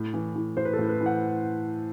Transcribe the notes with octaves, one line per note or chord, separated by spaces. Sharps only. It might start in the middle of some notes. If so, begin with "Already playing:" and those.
Already playing: A2
E3
E3
A2 C5
B4
A4
A2
B4
E3
F#5